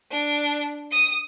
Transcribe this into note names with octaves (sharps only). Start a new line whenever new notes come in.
D4
D#6